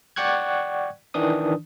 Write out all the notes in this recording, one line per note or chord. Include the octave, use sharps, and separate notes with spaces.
D5 F#5 G5 C#6 F#6 G#6
D#3 E3 D4 D#6